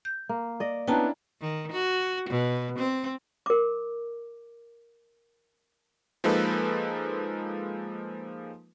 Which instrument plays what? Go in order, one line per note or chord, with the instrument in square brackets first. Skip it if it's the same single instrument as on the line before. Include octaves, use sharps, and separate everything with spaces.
[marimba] G6
[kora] A#3
D5 D#5
[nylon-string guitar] B3 [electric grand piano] C#4 D4 E4 [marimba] G5 A5 A#5
[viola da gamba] D#3
F#4
B2
C4
[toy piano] A#4 D6
[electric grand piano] F3 G#3 A#3 D#4 A4 B4